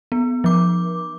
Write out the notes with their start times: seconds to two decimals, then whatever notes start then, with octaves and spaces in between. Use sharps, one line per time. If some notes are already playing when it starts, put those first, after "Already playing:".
0.12 B3
0.44 F3 D6